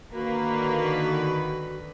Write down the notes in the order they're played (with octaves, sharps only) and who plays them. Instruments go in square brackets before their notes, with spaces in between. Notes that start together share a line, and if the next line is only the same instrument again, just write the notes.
[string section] D3 D#3 B4 [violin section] A#3 [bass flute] F#4